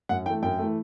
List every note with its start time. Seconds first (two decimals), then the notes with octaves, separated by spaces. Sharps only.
0.09 F#2 F#5
0.26 E3 A3 G5
0.43 F#2 G5
0.59 E3 A3